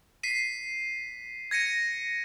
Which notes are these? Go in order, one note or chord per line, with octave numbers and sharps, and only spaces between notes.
B6 C7 D#7
G#6 A#6 C#7 D#7